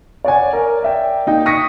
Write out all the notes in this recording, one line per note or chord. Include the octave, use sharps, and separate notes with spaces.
C#5 D5 F#5 G#5
A#4 D5
D5 E5 G5
A#3 D#4 G5
C#6 D#6 A#6 B6 C#7